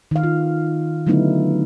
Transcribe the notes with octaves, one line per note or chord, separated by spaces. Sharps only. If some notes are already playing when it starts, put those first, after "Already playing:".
D#3 F5
F4
D3 F#3 A3 B3 D#4 E4